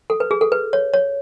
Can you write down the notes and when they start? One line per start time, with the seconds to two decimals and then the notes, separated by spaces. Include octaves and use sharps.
0.10 A4
0.20 B4
0.31 G#4
0.41 A4
0.52 B4
0.73 C#5
0.94 C#5